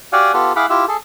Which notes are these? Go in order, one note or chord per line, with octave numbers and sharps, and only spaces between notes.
F#4 G4 D5 F5 F#5 G#5
B3 F4 G4 A4
E4 G#4 F5 F#5 B5 D6
E4 F4 G4 E5
G#4 A4